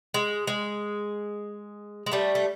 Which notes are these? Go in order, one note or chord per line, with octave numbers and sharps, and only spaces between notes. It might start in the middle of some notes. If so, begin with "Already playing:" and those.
G#3
G#3
G#3
G3 A3
A3